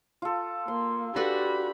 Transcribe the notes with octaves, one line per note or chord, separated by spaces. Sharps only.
F4 A4
A#3 C6
D4 F#4 G4 A4 B4 B5